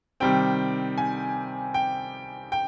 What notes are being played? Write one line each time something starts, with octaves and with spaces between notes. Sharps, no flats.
C3 D#3 G3 C4 G5
G#5
G5
G5